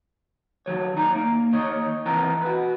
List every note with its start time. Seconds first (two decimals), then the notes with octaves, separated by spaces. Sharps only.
0.66 D#3 F#3 C#5
0.97 D#2 D#4 D5 A#5
1.15 A#3
1.53 D#2 D#3 D#4 C#5
2.06 E3 B3 C4 A#4
2.42 F#4 B4